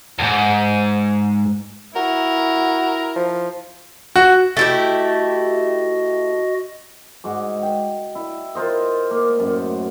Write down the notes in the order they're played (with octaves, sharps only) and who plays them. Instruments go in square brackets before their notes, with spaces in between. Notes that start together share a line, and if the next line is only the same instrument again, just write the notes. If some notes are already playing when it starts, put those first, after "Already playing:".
[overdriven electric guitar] D2 G#2
[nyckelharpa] E4 [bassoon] F#4 [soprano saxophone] A#4
[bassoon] F3
[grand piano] F#4
[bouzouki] A3 E4 G4 [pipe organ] F#4 D#5
[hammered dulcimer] G#2 F#4 D6
G5
E4
F4 A#4 C5 D#5
A#3
F#2 A2